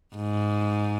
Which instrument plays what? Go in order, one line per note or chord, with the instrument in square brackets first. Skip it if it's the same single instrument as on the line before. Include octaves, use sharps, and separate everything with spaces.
[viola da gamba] G#2